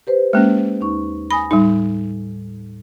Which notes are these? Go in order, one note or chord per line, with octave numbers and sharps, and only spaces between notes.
G4 B4 C5
G#3 A#3 C#4
D#2 D#4 C#6
G#5 B5 D#6 A#6
A2 G3 D#4